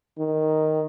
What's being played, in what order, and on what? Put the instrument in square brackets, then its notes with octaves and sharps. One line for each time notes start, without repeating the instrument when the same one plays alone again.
[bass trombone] D#3